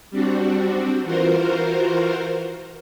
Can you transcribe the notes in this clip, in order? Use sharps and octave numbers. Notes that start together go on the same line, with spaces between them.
G3 C4 D4 F#4
E3 F4 F#4 A#4 C5